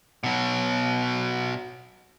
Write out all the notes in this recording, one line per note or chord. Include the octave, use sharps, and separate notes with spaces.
B2 F#3